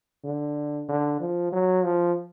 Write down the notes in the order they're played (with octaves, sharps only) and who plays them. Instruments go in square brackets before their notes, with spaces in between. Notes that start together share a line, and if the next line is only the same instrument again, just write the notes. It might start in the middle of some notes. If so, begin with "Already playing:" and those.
[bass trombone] D3
D3
F3
F#3
F3